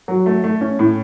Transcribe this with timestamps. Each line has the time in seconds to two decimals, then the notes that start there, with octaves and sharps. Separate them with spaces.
0.08 F#3
0.26 A3
0.44 A3
0.61 C#4
0.79 A2